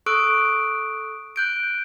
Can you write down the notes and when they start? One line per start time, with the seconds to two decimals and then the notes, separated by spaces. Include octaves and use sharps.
0.06 A4 C#6 D#6 E6 F#6 D7
1.36 F#6 G6 D7